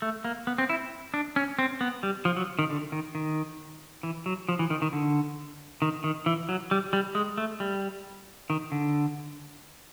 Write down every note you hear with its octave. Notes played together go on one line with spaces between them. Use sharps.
A3
A#3
B3
C4
E4
D4
C#4
C4
B3
G3
F3
F#3
D#3
D3
D#3
D#3
E3
F#3
F3
E3
D#3
D#3
D3
D#3
D#3
E3
F#3
G3
G3
G#3
A3
G3
D#3
D3